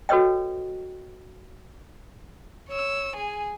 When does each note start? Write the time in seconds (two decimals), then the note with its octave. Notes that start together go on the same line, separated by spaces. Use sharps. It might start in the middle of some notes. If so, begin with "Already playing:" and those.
0.09 F#4 A4 B4 C#5 D#5 G5
2.69 C#5 E6
3.16 G#4 G#5